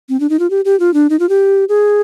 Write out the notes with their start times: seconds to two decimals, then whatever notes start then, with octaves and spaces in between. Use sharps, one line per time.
0.09 C4
0.20 D4
0.30 D#4
0.39 F4
0.50 G4
0.65 G4
0.80 F4
0.94 D4
1.10 D#4
1.19 F4
1.29 G4
1.69 G#4